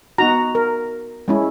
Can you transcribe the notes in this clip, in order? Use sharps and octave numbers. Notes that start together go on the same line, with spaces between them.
B3 D#4 F#4 A#5
A#4
G#3 C#4 E4